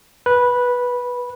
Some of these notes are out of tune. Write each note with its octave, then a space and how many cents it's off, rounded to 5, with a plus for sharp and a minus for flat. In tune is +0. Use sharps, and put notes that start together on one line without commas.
B4 -10